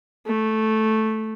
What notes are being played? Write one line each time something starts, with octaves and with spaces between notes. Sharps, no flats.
A3